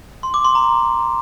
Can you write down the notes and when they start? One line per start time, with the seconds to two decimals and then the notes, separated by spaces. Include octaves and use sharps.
0.23 C6
0.34 D6
0.45 C6
0.55 A#5